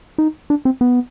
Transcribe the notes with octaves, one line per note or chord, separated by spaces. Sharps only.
D#4
D4
C4
B3